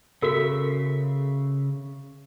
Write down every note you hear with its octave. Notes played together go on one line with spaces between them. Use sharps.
C#3 F#4 A4 A#4 E5